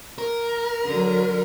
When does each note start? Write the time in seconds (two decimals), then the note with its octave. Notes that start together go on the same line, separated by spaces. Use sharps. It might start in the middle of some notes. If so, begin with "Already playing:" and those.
0.18 A#4
0.84 D3 F#3